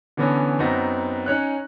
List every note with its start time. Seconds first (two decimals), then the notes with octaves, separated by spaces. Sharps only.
0.17 D3 E3 B3 C#4 A#6
0.59 F#2 B3 C4 D#4 F#5 A#6
1.26 C#4 D#4 C#5 F#6